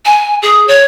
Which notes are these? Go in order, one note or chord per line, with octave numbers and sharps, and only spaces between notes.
G#5
G#4
C#5